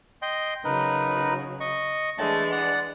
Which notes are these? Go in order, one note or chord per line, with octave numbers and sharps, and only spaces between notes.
D#5 G5 C6
C#3 F#3 D#4 A#4 B4
D#5 C#6
E3 G#3 A3 D4 A5
D5 F#5